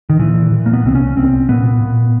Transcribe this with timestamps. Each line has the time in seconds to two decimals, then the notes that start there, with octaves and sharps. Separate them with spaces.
0.10 D#3
0.19 A#2 E3
0.51 A#2
0.66 A#3
0.73 B3
0.84 C2 C4
0.95 C#4
1.17 C2 C4
1.49 A#2 B3
1.81 A#2